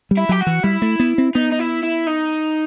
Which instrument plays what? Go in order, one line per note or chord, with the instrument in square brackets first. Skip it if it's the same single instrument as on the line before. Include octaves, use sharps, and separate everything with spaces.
[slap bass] G3
[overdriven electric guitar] E4
[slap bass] F#3 [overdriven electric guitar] G4
[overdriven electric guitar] F#4
[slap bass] E3
[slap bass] G3 [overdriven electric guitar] E4
[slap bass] A3
B3
C4
[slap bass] B3 [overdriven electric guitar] D#4
[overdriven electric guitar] D#4
E4
E4
D#4